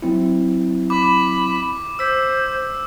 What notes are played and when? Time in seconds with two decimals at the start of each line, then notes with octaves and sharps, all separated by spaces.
0.02 F#3 C4 E4
0.90 B5 D6
1.99 C5 D6 E6 B6